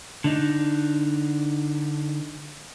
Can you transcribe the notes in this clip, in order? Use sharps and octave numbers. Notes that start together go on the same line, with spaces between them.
D3 D4 D#4